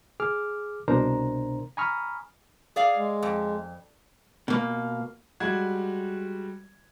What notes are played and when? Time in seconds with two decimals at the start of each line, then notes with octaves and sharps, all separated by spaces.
0.20 G#4 D6 F6
0.88 C2 B2 D4 A#4 C5 A#5
1.77 G#5 A#5 B5 C#6 D#6 F6
2.76 G#4 D5 F5
2.96 G#3
3.23 F2
4.48 B2 A#3
5.40 G3 G#3 F#4 G#6